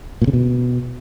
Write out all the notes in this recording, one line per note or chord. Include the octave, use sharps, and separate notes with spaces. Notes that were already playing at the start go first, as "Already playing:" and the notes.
A#2
C#3
B2